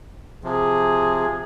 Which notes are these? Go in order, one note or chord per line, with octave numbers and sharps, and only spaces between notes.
C3 F3 G#4